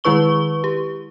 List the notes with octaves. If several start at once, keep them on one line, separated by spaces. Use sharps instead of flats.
D#3 G#3 E4 B4 C#6 G7
G4